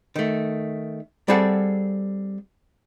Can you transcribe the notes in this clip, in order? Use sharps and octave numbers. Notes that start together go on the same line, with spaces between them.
D#3 A3
G3 C4 G#4 A4 F#5